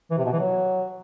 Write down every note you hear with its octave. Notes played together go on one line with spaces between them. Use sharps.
E3
C3
B2
E3
F#3